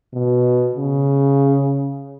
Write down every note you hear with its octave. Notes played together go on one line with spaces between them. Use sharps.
B2
C#3